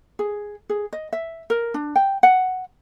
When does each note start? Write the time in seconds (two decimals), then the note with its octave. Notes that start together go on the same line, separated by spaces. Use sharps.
0.19 G#4
0.70 G#4
0.93 D#5
1.13 E5
1.50 A#4
1.74 D4
1.96 G5
2.23 F#5